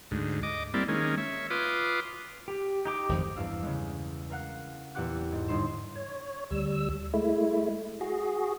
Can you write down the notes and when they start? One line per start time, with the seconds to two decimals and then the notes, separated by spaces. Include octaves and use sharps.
0.11 D2 G#2
0.43 D#5 D6
0.74 G3 A#3 C4 E4 D5
0.88 D#3 G#3 A#3 C#4
1.18 C#5 E5
1.50 F4 B4 C6 D6 D#6
2.48 G4
2.85 D#4 G4 D6
3.09 G#1 F2 F3
3.36 E2 G2 F5 E6
3.62 C#3 G#3
4.30 A#4 F5 F#5 F#6
4.95 E2 A#2 G4 F#5 D6 F#6
5.32 G#2
5.48 G1 D#4 C6 E7
5.96 C#5
6.51 D2 G3 E6
7.14 G#3 A3 E4
8.01 F#4 G#4